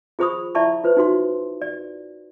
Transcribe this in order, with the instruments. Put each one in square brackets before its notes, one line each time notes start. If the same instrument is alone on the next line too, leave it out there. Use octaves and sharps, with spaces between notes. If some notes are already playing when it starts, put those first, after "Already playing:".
[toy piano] F4 G#4 C5 B5 C#6 D#6
E4 D5 E5 A5 B5 C#6
F4 B4 C5
D#4 F#4 C6
D5